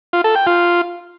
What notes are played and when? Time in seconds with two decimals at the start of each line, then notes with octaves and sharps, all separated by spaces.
0.13 F4
0.24 A4
0.35 G5
0.46 F4